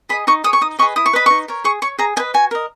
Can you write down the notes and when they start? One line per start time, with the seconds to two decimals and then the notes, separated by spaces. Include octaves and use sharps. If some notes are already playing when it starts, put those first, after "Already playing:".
0.09 G#4 D#5 B5
0.27 D#4 C#6
0.44 G#4 C#5 D#6
0.53 C#6
0.61 D#4 D#6
0.79 G#4 B4 D#5 C#6
0.96 E4 D#6
1.06 C#6
1.13 B4 D#5 B5
1.26 D#4 C#6
1.48 A#4 C#5
1.64 G#4 C#6
1.82 C#5 C#6
1.99 G#4 A#5
2.16 D#5 G#5
2.20 B4
2.34 F#4 G#5
2.51 A#4 D#5